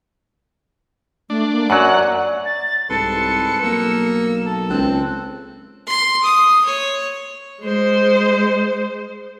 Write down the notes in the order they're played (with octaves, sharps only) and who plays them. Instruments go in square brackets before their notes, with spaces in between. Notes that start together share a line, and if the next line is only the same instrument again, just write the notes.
[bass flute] A3 [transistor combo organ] D4
[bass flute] A#3
[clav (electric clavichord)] F#2 F#3 [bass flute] D5 [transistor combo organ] F#5
[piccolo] A6
[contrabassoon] C2 [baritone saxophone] G#2 [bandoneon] A4 B4 C6 [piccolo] C#7
[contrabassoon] B1 [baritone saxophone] A#3 [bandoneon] E6
[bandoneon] A4
[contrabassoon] C#2 [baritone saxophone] C4 [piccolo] F#6
[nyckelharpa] C6
D#6
C#5
[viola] G#3 C5